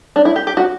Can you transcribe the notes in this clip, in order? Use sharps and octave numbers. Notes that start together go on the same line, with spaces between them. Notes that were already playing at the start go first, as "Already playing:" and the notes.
D4
E4
G4
G4
F#4